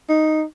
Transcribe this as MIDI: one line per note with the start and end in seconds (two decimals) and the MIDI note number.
0.09 0.42 63